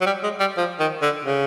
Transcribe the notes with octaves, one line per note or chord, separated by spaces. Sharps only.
F#3
G3
G#3
G3
F3
D#3
D3
C#3